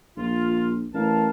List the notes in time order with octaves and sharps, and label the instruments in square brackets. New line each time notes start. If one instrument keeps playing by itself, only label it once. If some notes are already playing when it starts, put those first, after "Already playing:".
[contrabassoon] A#1 [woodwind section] F4
[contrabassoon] A1 [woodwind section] A#4 F5 A5